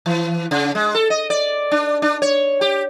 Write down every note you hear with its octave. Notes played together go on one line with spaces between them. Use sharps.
E3
C#3
G#3
A4
D#5
D5
D4
D4
C#5
G4